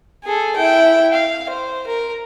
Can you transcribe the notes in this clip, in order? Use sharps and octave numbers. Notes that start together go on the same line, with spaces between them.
G#4 A4
E4 G5
F5
C5
A#4